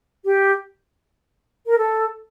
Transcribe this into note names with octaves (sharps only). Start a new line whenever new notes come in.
G4
A#4
A4